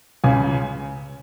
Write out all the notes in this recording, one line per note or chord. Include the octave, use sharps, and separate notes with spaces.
C#2 C#3 G#5